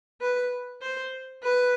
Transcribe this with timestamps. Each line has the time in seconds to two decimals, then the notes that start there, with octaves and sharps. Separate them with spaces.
0.21 B4
0.82 C5
1.43 B4